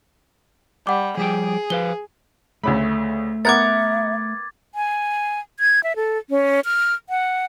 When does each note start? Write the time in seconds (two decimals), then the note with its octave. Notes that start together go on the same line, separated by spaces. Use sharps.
0.87 G3 F#5 D6
1.17 F3 G3 G#4 G5
1.70 F3 B4 F5 G7
2.64 D2 C#3 A3 B5
3.45 B3 A#4 E5 F#5 D6 G#6 A6
4.75 G#5
5.60 G#6
5.83 E5
5.96 A4
6.30 C#4
6.65 F6
7.09 F#5